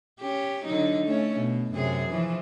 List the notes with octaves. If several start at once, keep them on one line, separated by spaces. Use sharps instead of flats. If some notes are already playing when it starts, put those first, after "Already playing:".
C#4 G4
D3 F#3 D#4
A3 C#4
B2
F#2 C3 G#4
E3 F3